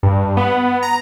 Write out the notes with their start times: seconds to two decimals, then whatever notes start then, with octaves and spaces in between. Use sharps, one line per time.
0.03 G2
0.37 B3
0.83 A#5